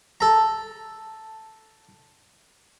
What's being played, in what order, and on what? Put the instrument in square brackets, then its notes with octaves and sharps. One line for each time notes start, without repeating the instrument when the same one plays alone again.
[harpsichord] A4 A#5